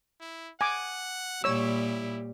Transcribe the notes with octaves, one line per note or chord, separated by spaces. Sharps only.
E4
F#5 G#5 D6
A#2 G3 E4 C#5 E6